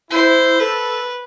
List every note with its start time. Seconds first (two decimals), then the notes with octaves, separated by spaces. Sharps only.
0.10 E4 C5
0.60 A4 B4